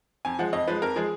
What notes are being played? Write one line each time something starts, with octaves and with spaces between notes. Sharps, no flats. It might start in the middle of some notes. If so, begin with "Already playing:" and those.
F2 G#5
F3 G#3 F#5
F2 D#5
F3 G#3 B4
F2 A#4
F3 G#3 G#4